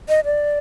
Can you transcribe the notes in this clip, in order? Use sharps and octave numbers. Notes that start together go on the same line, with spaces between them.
D#5
D5